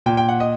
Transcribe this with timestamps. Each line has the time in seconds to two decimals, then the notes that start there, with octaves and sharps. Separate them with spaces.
0.06 A#2 G5
0.17 G5
0.29 F#5
0.40 D#5